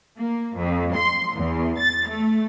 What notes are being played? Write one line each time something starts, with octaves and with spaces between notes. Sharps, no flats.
A#3
F2
C6
E2
A6
A3